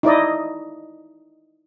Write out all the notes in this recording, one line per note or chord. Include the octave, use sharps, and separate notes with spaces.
D#4 E4 D5 D#5